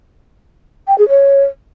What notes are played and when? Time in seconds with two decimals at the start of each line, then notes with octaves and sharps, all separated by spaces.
0.88 G5
0.98 G#4
1.09 C#5